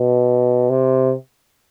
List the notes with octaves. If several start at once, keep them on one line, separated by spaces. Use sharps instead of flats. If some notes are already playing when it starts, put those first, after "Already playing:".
Already playing: B2
C3